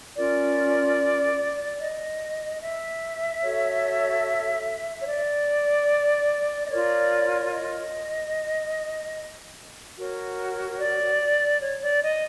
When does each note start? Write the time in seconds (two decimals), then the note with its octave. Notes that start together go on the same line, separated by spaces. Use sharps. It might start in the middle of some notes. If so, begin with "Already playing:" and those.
0.15 C#4 F4 A#4 D5
1.79 D#5
2.61 E5
3.42 F#4 A4 C#5
5.02 C#5
5.06 D5
6.65 D#5
6.70 F4 A#4 C#5 D5
7.41 D5
7.51 D#5
9.97 F#4 A#4 C#5
10.78 D5
11.60 C#5
11.81 D5
12.02 D#5